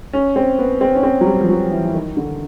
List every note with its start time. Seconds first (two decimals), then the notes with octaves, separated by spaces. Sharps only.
0.13 C#4
0.36 C4
0.59 B3
0.81 C4
0.95 C#4
1.03 C4
1.21 F#3
1.26 G3
1.41 F3
1.49 F#3
1.71 E3
1.85 E3
1.94 D#3
2.17 D3